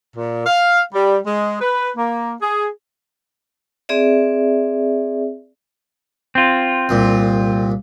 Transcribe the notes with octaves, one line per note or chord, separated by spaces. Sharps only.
A#2
F5
G3
G#3
B4
A#3
G#4
C4 G#4 D5 E5
C4 F4
C2 A#2